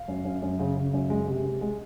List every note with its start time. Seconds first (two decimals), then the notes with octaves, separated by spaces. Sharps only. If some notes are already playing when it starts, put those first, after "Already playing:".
Already playing: F5
0.08 F#2
0.25 F#2
0.42 F#2
0.59 C#3
0.76 C#3
0.94 F#2
1.10 G#3
1.27 C3
1.45 C3
1.61 G#3